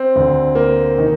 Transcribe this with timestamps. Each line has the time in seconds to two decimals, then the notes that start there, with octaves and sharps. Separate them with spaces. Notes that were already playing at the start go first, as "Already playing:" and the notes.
Already playing: C4
0.16 D2 D3
0.55 A#3
0.98 D#3